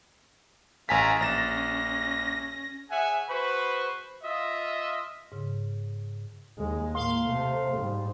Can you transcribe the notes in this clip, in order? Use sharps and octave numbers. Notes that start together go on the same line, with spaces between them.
A1 F5 G#5 A#5 B6
A#1 C#4 A6 A#6 E7
G#4 C#5 E5 F#5 G#5
F#4 G#4 B4 C5 B5 C#6
F4 D#5 E5
G#2 C#3
D#2 G#3
A2 A#3 F5 C6
C3 A3
G#2 G3